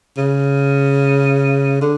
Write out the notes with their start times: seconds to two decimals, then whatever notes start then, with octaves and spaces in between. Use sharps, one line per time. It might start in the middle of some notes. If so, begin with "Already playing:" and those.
0.17 C#3
1.81 D3